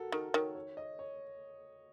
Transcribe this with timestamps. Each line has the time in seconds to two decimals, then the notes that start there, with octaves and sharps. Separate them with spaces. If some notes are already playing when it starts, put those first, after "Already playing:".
Already playing: F#4 A4 A#4
0.12 D#3 A#4
0.34 D#3 C#5
0.55 C#5
0.77 D#5
0.99 C#5